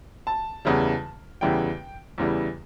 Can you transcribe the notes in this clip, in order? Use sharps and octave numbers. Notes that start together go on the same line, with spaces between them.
A5
E2 C#3 E3 G3
E2 C#3 E3 G3 G5
E2 C#3 E3 G3